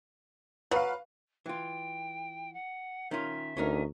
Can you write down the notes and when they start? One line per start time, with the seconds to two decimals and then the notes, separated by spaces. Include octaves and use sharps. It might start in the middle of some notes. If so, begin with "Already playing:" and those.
0.71 F#3 B4 F5
1.46 E3 F4 G5
2.53 F#5
3.11 D#3 C#4 F4 E5
3.57 D2 C#4 D#4 A#4